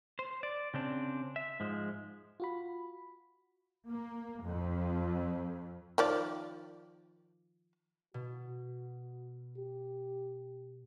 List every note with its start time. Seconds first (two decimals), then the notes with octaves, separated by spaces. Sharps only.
0.19 C5
0.43 D5
0.74 C#3 C4 D4
1.36 E5
1.60 G#2 F3 G#3
2.40 F4 F#4 B5
3.89 A#3
4.44 F2
5.98 D#3 F3 D5
8.14 B2 F#4
9.58 G4